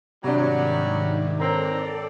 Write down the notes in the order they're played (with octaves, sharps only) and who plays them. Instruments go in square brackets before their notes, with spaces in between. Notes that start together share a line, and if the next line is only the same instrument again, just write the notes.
[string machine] G#2 D#3 [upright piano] C3 D4 [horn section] F#3 G3
[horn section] D3 C4 A#5 [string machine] A4 D5 [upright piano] A#4 C#5